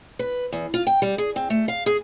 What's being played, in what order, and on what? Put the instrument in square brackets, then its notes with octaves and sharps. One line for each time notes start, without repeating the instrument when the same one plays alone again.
[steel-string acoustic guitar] B4
E2
F4
G5
G3
G#4
C4
A3
F5
G#4